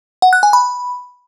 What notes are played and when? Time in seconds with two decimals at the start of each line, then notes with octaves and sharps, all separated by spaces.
0.22 F#5
0.33 F#6
0.43 G#5
0.53 B5